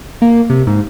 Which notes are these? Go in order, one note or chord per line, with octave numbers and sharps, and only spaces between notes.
A#3
C3
G#2